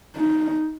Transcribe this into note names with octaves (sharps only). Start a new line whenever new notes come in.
D#4